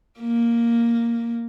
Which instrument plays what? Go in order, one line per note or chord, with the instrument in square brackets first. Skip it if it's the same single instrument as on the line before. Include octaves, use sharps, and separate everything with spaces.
[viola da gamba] A#3